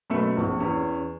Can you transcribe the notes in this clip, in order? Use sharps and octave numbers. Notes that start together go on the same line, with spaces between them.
F#2 B2 A3 B4 E5 C#7
A#1 C4 C#6
E2 C#4